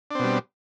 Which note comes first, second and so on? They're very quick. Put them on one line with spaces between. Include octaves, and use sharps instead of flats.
D4 C4 B2 G3